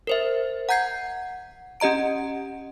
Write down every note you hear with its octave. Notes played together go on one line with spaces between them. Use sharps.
A#4 C5 E5
F#5 A#5 G6 G#6 C7
C#4 G4 D#5 A#5 D7